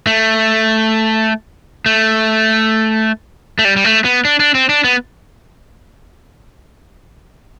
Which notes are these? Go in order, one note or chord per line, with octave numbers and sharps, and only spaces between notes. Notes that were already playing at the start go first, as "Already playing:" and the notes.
A3
A3
A3
G3
G3
A3
B3
D4
D4
C4
D4
B3